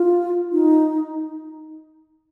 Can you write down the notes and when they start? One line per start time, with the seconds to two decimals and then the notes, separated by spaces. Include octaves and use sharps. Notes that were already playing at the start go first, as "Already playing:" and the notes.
Already playing: F4
0.52 D#4